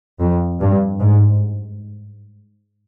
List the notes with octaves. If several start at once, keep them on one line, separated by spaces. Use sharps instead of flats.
F2
G2
G#2